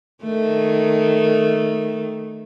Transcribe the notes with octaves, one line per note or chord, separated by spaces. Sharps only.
D#3 A3